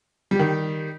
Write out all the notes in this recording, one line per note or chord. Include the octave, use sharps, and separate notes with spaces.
D#3 G3 G4